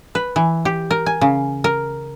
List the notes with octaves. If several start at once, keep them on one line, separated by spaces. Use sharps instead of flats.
B4
E3
G4
A#4
G#5
C#3
A#4